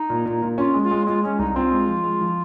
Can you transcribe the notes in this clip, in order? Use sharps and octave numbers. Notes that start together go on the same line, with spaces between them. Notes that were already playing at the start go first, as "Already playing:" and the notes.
Already playing: D#4
A#2
A#2
A#2
C#4 F4
G#3
F4
G#3
G#3 F4
G#3 C#4
C2 D#4
C4 F4
G#3
F3
G#3
F3